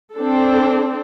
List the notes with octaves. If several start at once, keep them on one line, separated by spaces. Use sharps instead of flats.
C4 D4 A4